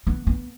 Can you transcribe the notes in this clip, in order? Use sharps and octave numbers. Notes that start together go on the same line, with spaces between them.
B3
B3